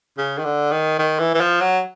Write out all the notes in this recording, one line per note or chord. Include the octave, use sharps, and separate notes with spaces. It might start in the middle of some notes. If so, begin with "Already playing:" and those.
C#3
D#3
D3
D#3
D#3
E3
E3
F3
F#3